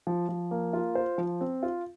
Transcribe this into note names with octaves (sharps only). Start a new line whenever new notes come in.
F3
F3
A#3
F4
C5
F3
C4
F4